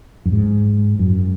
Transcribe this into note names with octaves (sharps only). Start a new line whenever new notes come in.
F#2
G#2
F#2